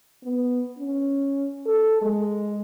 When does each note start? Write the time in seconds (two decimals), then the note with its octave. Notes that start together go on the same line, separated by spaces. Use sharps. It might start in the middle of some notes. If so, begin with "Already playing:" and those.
0.23 B3
0.78 C#4
1.66 A4
2.02 G#3